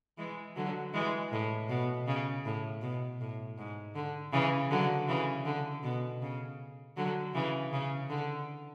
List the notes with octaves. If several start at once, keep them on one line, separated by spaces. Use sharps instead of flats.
E3 G#3
D3 F#3
E3 G#3
A2
B2
C#3
A2
B2
A2
G#2
D3
C#3 E3
D3 F#3
C#3 E3
D3
B2
C#3
D3 F#3
C#3 E3
C#3
D3